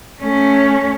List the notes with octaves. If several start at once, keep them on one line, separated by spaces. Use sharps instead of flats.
A3 C#4